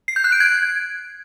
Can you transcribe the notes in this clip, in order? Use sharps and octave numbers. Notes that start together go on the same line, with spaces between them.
C7
G6
F#6
D7
G#6